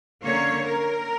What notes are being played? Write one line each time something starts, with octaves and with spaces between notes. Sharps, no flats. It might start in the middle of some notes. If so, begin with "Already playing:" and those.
D3 A#3 C#4 C#5
A#4